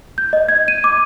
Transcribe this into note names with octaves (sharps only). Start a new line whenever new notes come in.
G6
D#5
G#6
D#7
D6